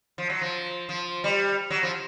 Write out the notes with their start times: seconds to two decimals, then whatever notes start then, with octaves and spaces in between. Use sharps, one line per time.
0.18 F3
0.30 F#3
0.41 F3
0.89 F3
1.24 G3
1.70 F#3
1.83 F3